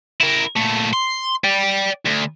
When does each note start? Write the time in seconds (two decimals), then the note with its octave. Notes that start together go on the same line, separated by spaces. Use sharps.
0.21 E4 A#4
0.57 A#2 A3
0.93 C6
1.44 D5 G5
2.06 D2